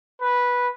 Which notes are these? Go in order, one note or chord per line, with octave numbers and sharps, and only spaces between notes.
B4